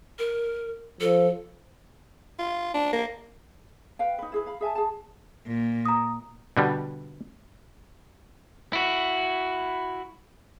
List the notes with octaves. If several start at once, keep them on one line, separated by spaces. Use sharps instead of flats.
A#4
F3 A4
F4
D4
A#3
B4 F5 G5
D#4 B4
E4 G#4 B4
F5 B5
G#4 E5 G#5 A5
G#4 A5
A#2
A#5 D#6
B2 D3 G3
E4 F#4